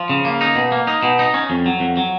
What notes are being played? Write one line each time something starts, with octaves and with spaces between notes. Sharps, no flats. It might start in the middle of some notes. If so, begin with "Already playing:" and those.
Already playing: F3
C#3
A#3
D#4
B2
A#3
D#4
B2
D#4
C#4
F2
F#3
F2
F#3